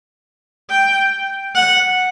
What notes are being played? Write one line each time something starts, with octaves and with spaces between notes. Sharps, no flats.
G5
F#5